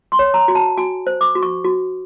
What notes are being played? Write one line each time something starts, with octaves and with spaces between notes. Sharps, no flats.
C6
C#5
A#5
F#4
A5
F#4 G#5
C5
D6
F#4
C#6
F#4